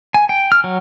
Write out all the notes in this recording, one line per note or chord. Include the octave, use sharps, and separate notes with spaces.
G#5
G5
F6
F#3